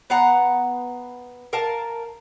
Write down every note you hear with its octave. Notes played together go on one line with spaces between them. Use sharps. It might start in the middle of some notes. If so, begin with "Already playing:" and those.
B3 F5 F#5 A#5
A#4 F5 A5